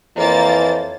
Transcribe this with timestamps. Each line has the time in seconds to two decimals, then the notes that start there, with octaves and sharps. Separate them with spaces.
0.18 F2 E3 A#3 C5 C#5 A6